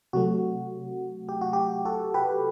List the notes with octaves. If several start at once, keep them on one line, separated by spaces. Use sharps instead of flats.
C3 F#3 A3 F#4
G4
F#4
G4
F#4 A4
G4 B4